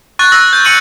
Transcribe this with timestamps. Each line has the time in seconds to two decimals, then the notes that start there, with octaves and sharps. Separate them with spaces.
0.19 C#6 F#6 A6
0.32 E6 F#6 A#6
0.53 G6
0.65 C#6 C#7 D#7 F#7